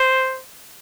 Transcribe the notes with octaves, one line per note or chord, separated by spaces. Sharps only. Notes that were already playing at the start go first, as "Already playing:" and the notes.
Already playing: C5